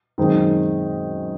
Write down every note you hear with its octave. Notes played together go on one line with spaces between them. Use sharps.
F#2 D#3 G#3 C4 D#4